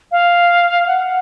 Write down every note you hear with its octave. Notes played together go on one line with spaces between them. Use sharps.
F5
F#5